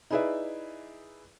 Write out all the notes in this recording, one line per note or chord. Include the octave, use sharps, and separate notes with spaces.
D#4 E4 G#4 B4 D5 E5